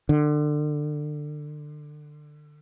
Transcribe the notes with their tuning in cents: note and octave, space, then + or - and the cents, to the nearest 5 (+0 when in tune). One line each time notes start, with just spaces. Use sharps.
D3 +25